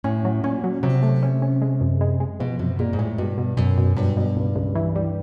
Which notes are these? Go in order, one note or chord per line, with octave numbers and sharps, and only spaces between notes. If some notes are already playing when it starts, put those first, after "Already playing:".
A2 C#4
F#3
A#2 C#4
F#3
C3 F#3
A3
C#4
C#4
G#3
F#2
G#3
G#3
B2 F3
F#2 C3
A#2 G#3
G#2
A2 G#3
G2 B2
B2
F#2 B2
B2
G2 F#3
B2
C#2
C#2
E3
G3